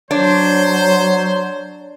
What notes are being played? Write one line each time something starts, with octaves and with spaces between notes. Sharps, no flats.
F#3 D4 C5 C#5